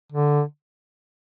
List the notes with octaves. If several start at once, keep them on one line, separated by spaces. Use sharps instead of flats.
D3